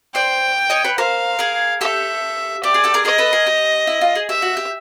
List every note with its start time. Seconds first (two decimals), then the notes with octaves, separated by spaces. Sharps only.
0.15 C5 D5 G5
0.70 C#5 D#5
0.84 B4 C#5
0.98 A#4 C5 F5
1.39 G#4 A#4
1.81 G4 A4 E5
2.63 G4 D5
2.74 G#4
2.84 G4 A4
2.94 G#4 A#4
3.05 G#4 A#4 D#5
3.18 A4 B4
3.33 G#4 A#4
3.47 G4
3.87 E4
4.01 F4
4.15 G#4
4.29 G4 E5
4.42 F#4
4.57 G4